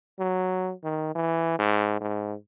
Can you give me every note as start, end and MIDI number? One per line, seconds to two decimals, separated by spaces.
0.19 0.72 54
0.84 1.15 51
1.15 1.56 52
1.59 1.98 44
2.01 2.34 44